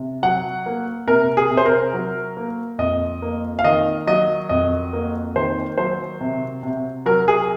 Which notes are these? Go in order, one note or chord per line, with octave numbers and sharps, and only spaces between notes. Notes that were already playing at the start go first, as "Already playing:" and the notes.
Already playing: C3
F#3 F#5
A#3
C3 A#4
G#4
C3
C5
A#4
F#3
A#3
F2 D#5
A#3
F5
D#3 D#5
F#3 D#5
F2 D#5
A#3
D#3 C5
F#3 C5
C3
C3
F#3 A#4
G#4